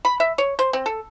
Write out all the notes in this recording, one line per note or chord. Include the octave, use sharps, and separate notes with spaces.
B5
E5
C#5
C5
C4
A4